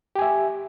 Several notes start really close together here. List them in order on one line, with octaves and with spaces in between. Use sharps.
G4 G#5 E5